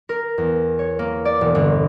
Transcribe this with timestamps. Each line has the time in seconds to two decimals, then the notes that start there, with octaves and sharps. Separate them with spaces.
0.09 A#4
0.38 E2
0.79 C#5
0.99 A#3
1.25 D5
1.41 E1
1.55 G1